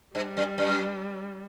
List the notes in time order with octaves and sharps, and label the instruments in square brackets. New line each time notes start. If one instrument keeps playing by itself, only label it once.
[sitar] G2 [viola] G3
[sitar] F#2
F#2